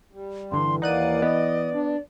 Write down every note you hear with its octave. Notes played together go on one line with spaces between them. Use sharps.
G3
G2 D3 E3 C6
D#2 A#3 D#4 D5 F#5 F#6 D#7
B3 D#5
D4